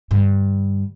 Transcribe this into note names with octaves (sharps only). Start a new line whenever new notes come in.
G2 D3